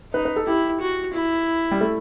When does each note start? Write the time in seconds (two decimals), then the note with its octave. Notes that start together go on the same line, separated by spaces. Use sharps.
0.13 D#4 B4
0.25 B4
0.36 A4
0.47 E4 G4
0.81 F#4
1.14 E4
1.71 G3
1.81 A3